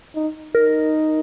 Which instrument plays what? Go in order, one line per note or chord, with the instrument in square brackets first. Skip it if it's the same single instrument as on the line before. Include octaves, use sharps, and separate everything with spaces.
[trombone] D#4
[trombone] D#4 [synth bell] A#4